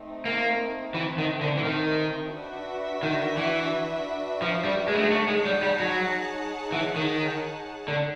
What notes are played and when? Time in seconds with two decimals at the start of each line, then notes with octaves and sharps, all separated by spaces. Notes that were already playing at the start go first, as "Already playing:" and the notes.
Already playing: A3 C4 D#4
0.25 A#3
0.94 E3
1.18 D#3
1.41 D3
1.57 E3
1.64 D#3
2.33 D4 F#4 B4 E5
3.03 D#3
3.37 E3
4.42 F3
4.64 G3
4.88 G#3
4.95 A3
5.02 G#3
5.10 A3 D#4 G#4 C#5 F#5 A5
5.28 G#3
5.45 G3
5.63 G3
5.80 F#3
6.72 E3
6.96 D#3
7.88 D3